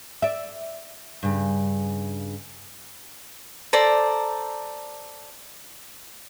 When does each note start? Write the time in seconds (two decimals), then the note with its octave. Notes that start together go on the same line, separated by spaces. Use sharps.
0.22 D5 E5
1.23 G2 C#3
3.73 A4 C5 D5 A#5